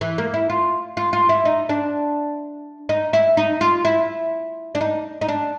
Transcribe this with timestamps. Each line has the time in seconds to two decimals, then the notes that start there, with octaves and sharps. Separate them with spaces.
0.01 E3
0.18 A#3
0.34 E4
0.50 F4
0.97 F4
1.13 F4
1.29 E4
1.45 D#4
1.69 D4
2.89 D#4
3.13 E4
3.37 D#4
3.61 F4
3.85 E4
4.75 D4
4.81 D#4
5.21 D#4
5.28 D4